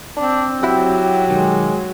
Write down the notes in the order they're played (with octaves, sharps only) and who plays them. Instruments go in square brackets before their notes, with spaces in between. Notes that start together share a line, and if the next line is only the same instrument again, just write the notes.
[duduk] C4 [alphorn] D4
[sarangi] F#3 [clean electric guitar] E4 F#4 [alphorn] G4
[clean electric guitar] B1 D#3 [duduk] G#3